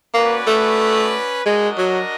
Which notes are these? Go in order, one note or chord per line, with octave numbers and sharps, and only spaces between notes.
A#3 C#4 F#4 B4 D5
A3
G#3 D4 F#4 A#4 D#5
F#3